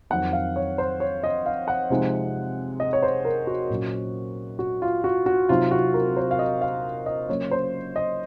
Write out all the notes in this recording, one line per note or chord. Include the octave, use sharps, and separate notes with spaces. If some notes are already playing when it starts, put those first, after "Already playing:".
F2 D#3 F#3 C4 F#5
F5
C#5
C5
C#5
D#5
F5
F#5
C3 F3 G#3 C4 D#4
D#5
C#5
C5
A#4
F#4
A#2 F#3 C#4
F#4
F4
F#4
F#4
C3 F#3 C4 D#4 F4
F#4
A#4
C5
F5
D#5
F5
D#5
C#3 F#3 A#3 C#5
C5
D#5